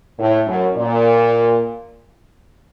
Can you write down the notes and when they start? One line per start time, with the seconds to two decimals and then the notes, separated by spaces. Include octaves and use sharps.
0.19 A2
0.47 F#2
0.76 A#2